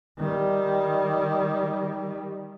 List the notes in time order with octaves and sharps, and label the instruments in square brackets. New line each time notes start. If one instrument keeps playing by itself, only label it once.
[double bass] D#3 G3